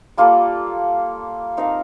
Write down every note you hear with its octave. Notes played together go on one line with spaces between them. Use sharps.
G3 A#3 F4 A4
C4 D#4 A#4 F5